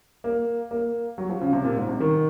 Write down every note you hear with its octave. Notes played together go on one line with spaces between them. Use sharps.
A#3
A#3
F#3
F3
C#3
C3
A#2
G#2
C3
D#3